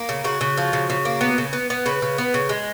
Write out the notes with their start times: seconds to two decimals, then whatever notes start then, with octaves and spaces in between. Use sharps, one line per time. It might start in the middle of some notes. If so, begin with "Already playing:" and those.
Already playing: A#3
0.09 C#3
0.24 C#3 F#4
0.41 C#3
0.57 F3
0.73 C#3
0.90 C#3
1.05 A#3
1.21 B3
1.38 C#3
1.53 B3
1.70 B3
1.86 C#3 B4
2.02 C#3
2.18 B3
2.34 C#3
2.49 G#3